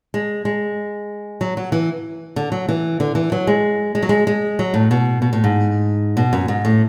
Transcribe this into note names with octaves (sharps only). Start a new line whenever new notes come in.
G#3
G#3
F#3
F#3
E3
D3
F#3
E3
D3
E3
F#3
G#3
G#3
F#3
G#3
G#3
F#3
A2
B2
B2
A2
G#2
B2
F#2
G#2
A2